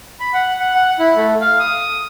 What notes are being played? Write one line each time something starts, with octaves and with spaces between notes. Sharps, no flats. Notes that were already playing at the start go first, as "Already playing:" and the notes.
B5
F#5
F#5
F#5
E4
A3
F5
D#6